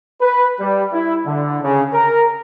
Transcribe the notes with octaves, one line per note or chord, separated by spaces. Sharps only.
B4
G3
E4
D3
C#3
A#4